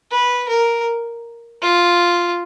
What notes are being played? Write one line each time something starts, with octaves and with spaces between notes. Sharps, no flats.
B4
A#4
F4